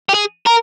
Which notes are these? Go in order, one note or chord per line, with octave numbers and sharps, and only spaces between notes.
G4
G#4
A#4